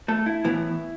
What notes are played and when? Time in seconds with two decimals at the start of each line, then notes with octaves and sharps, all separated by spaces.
0.08 A3 A4
0.26 E4
0.44 A2 E3 B3 E4